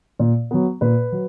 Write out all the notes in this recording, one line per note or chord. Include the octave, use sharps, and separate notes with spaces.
A#2
F#3 B3
A#2 B4
F#3